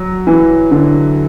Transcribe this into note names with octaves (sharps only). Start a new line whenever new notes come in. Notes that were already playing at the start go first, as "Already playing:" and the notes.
Already playing: F#3
E3
D3